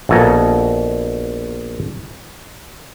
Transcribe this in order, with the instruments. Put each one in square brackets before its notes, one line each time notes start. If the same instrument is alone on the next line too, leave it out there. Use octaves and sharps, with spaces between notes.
[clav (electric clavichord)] A#1 B2 A4 G#5 A#5